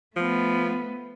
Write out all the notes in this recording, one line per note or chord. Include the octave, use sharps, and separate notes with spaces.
F3 A3 B3